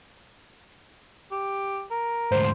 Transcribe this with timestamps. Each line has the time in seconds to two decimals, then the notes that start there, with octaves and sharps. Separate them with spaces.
1.32 G4
1.91 A#4
2.31 D2 G#2 C5